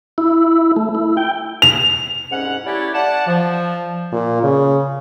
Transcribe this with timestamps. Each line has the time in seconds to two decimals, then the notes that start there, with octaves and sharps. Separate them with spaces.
0.18 E4
0.76 A3
0.95 E4
1.17 G5
1.62 F7
2.31 C2 G#2 C#4 F#5
2.66 A3 C#4 E4 G4 C#5 D5
2.94 D5 F#5 A5
3.27 F3
4.12 A#2
4.43 C#3